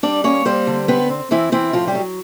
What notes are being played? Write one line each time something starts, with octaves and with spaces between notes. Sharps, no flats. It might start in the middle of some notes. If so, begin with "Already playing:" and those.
G3 D4 D5
A#3 C#4 C#5
G3 C4 C5
D3
B3 C4 B4
C4
E3 C4 E4
E3 C4 E4
A2 F3 F4
G3 G4
F#3